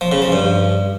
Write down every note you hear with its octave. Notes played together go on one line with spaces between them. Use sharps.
F3
C#3
F3
G2